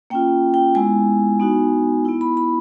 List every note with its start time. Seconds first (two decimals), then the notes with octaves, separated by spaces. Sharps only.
0.10 A#3 C#4 F4 G5
0.54 G5
0.75 G#3 B3 E4 G#5
1.40 B3 D#4 F#4
2.05 B3 E4
2.21 B5
2.37 B5